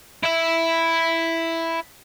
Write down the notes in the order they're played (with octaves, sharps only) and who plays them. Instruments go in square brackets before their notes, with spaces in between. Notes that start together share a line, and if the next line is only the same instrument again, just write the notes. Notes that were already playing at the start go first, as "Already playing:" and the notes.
[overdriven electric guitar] E4 E5